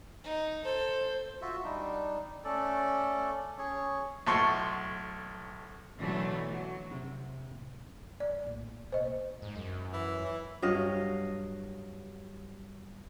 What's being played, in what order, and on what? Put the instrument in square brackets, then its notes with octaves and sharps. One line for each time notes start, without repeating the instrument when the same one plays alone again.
[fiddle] D#4
[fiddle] A4 [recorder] C5
[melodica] F4 F#4 E5
G3 D4 D#4
A3 C#4 A4 D5
C#4 G#4 C#5
[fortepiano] B1 A2 A4 C6 C#6
[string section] B2 D3 E3 F#3 A3
F#3
[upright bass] C3
F#2 A2
[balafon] D5
[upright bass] A#1 A2
[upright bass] B2 A#3 [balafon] C5 D#5
[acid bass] G#2
F#2
[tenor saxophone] E3
E3
[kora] G2 F#3 D#5 F5